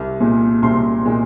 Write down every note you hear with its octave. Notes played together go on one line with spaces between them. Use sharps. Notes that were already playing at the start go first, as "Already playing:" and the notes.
Already playing: C2
A#2 G#3
C2 C6
A#2 G#3